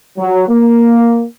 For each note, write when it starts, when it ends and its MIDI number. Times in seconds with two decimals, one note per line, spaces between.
0.17 0.48 54
0.48 1.24 58